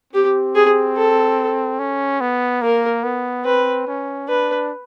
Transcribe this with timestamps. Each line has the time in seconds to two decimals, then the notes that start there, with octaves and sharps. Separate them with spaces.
0.13 C4 G4
0.55 G#4
0.97 A4
1.79 C#4
2.21 B3
2.62 A#3 A#4
3.03 B3
3.44 C4 B4
3.87 C#4
4.28 D4 B4